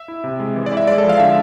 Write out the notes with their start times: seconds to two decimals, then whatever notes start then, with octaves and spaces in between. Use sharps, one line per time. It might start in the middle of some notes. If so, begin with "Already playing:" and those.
Already playing: E5
0.08 E4
0.24 C3
0.40 G#3
0.56 E3
0.66 D5
0.72 E4
0.77 E5
0.87 G#3 D5
0.98 A4
1.04 F3
1.09 F5
1.20 D3 E5